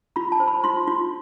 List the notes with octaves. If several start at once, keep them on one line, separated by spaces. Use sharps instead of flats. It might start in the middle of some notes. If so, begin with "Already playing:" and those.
F4 B5
A5
C5
B5
F4 C6
F4